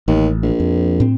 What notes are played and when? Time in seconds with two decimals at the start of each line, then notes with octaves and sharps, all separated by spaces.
0.08 A1 D#2
0.43 A#1
0.60 F2
1.00 A2 C4